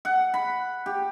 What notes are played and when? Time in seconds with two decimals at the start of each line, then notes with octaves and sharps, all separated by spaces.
0.05 F#5
0.34 B5
0.86 G4